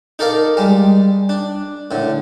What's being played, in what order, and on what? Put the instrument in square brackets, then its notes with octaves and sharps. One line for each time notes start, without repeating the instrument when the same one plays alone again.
[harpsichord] D#4 A4 A#4 D5 F5
G3 G#3
D4
A2 D3